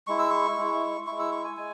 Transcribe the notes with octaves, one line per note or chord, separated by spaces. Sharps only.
G#3 E4 C#6
E6
C#6
G#3 E4
G#3 E4 C#6
E6
C#6
G#5
G#3 G#5